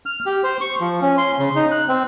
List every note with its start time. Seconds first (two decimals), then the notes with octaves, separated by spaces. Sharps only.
0.06 F6
0.26 G4
0.44 C5
0.61 C#6
0.80 F3
1.02 C#4
1.18 C6
1.38 C#3
1.56 D#4
1.72 F#6
1.89 C4